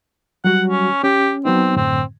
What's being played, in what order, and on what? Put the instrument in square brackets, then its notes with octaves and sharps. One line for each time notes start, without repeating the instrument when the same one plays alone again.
[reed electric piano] F#3 G3 F#4 [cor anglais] F#5
[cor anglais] C#4
[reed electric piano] C#4 [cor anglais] G4
[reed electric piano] F#3 B3 D#4 [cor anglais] C4
[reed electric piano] F#2 A2 D3 [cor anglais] C4